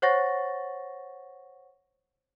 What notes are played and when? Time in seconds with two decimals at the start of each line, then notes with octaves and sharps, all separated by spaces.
0.02 C5 C#5 F#5 C#6 A6 A#6